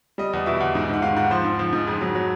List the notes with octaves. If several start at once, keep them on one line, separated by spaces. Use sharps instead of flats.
G3 D#5
E2 D#5
B2 E5
E2
G#2
G#2 F#5
D#3 F5
G#2 F#5
F3 C5
G#2
F3
G#2
F2 G#4
F#3
F#3